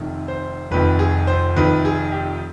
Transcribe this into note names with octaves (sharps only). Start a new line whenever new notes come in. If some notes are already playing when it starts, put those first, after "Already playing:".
Already playing: F1 F2 D#3
C5
F1 F2 D#3 B4
G#4
C5
F1 F2 D#3 B4
G#4
G4